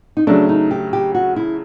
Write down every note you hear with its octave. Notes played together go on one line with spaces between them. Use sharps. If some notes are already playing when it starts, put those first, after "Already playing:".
D#4
C#3 F#3 A3 D4
D#4
G4
G4
F#4
E4